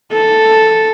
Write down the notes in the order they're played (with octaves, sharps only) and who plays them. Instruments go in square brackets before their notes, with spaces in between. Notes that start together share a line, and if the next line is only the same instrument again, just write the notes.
[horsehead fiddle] A4